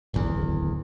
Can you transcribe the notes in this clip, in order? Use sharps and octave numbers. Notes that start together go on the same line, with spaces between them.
D1 G#1 E2